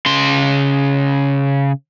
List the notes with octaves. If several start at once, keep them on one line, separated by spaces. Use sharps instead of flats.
C#3 C6